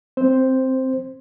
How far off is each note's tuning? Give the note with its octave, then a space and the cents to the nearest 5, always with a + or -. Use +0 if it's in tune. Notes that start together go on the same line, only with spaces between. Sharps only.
C4 +0 C5 +0